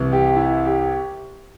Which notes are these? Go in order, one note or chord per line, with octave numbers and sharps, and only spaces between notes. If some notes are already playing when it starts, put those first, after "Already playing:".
Already playing: C2 C3 E3
G4
E4
G4